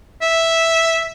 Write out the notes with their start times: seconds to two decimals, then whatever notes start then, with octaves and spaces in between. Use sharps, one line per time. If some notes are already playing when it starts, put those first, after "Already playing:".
0.22 E5